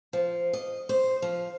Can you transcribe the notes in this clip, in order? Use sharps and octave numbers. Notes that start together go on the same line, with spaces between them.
F3
D#5
C5
F3